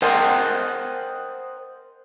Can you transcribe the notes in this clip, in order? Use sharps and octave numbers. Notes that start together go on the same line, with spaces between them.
A#4 C5 D#5 F#5 G5